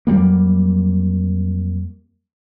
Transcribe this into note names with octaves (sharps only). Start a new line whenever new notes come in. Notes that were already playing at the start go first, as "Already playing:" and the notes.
F2 F#3 G3 A#3